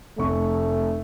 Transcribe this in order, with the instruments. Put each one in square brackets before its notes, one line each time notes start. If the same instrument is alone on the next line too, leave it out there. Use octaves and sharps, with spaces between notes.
[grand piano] F1 C#6 [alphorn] A3